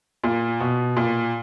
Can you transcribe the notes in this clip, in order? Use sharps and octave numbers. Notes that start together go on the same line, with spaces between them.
A#2
B2
A#2